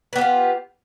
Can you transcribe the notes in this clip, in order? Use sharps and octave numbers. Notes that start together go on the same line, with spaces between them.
B3 F4 G4 B4